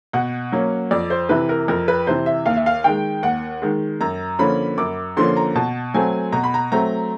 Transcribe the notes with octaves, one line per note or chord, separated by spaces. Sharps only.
B2 F#5
F#3 A#3 C#4
F2 D5
C5
C3 E3 B4
A#4
F2 A#4
B4
C3 E3 C5
E5
D#2 F5
E5
F5
D#3 G#3 G5
D#2 F#5
D#3 G#3
F#2 A#5
D3 F3 A#3 C#4 B5
F#2 D6
D3 F3 A#3 C#4 C6
A#5
B2 A5
F#3 A3 C4 G#5
B2 A#5
B5
A#5
F#3 A3 C4 A#5